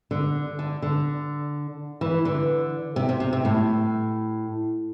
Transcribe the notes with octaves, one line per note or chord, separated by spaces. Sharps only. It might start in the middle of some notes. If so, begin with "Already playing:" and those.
D3
D3
D3
E3
D3
C3
C3
C3
C3
A2